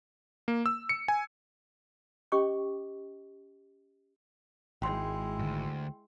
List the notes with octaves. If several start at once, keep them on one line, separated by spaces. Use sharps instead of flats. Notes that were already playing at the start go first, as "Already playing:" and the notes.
A#3
E6
C#7
G#5
C#4 G4 D#5 G5 C#6 D6
G#1 G#3 E4 G5 C6
D2 G2